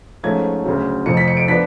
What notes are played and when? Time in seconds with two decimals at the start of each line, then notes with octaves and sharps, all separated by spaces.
0.23 G#2 F3 A3 C#4 G#6
0.64 D2 C#3 F#3
1.06 F1 F2 F3 C#7
1.17 B6
1.28 C#7
1.37 D7
1.47 F3 B3 D4 B6